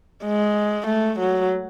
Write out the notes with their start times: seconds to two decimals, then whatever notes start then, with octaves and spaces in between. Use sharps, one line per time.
0.24 G#3
0.87 A3
1.19 F#3